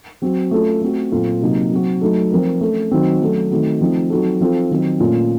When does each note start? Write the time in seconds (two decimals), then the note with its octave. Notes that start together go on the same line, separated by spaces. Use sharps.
0.22 F#3 C4 F#4
0.51 A3 C#4 F4 A4
0.81 A3 C4 F#4
1.12 A#2 F#3 C4 F4 A4
1.42 C3 F#3 A#3 D#4
1.72 F#3 C4 F#4
2.01 F#3 A3 D#4 A4
2.32 F3 C4 F4 A#4
2.61 A3 C#4 A4
2.91 D#3 F#3 C4 F#4
3.21 F#3 A3 C#4 A4
3.51 D#3 A3 C4 F#4
3.81 F3 A3 C4 D#4
4.10 F#3 C4 D#4 F#4 A4
4.40 F3 C4 F4 A4
4.71 D#3 F#3 C4
5.00 A#2 A3 C#4 F4